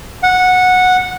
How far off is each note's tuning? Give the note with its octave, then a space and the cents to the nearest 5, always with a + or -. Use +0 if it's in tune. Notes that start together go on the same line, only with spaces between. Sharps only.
F#5 -15